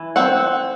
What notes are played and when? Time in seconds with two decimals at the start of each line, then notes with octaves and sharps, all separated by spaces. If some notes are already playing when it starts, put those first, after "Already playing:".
Already playing: E3
0.16 C4 F#5